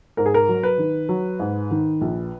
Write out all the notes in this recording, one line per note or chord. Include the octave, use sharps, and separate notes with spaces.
G#2 A#4
G#4
A#4
F#3
B4
D#3
F#3
G#2
D#3
A#1